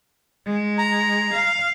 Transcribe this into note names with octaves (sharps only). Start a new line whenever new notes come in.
G#3
A#5
F5